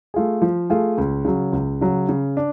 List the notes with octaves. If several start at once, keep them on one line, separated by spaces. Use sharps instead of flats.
A3 F4 G#4
F3
A3 F4 G#4
C#2
C#3 F#3
C#2
C#3 F#3
C#3
D4